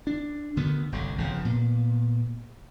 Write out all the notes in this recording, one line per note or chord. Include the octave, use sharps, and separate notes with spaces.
D4
D2 D3 D#3 B3
G1 C2 D3
G1 C#3 F3
A#2 B3